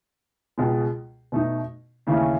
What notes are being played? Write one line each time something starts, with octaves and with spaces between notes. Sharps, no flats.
C#2 B2 G#3
B2 A3 D#4
D#2 C#3 E3 A3 C#4